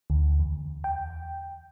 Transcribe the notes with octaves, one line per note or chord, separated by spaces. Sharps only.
D2
E2
G5